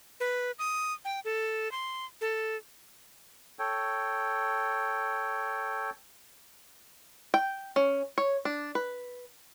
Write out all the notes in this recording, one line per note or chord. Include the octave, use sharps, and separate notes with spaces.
B4
D#6
G5
A4
C6
A4
A4 C#5 G5
G5
C#4
C#5
D4
B4